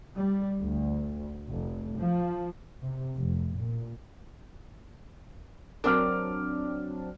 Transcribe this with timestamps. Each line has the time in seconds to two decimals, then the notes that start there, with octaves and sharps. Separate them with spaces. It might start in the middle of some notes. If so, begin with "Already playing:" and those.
0.15 G3
0.61 D2
1.48 F1
1.98 F3
2.83 C3
3.18 F1
3.57 A#2
5.84 F#3 C4 D4 A#4 D6 F6